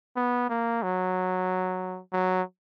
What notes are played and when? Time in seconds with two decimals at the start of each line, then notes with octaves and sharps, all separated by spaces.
0.16 B3
0.50 A#3
0.83 F#3
2.13 F#3